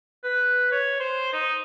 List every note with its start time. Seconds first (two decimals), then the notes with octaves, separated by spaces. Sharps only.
0.23 B4
0.71 C#5
1.00 C5
1.33 D#4